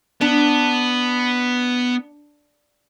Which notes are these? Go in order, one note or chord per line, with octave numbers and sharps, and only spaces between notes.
B3 D4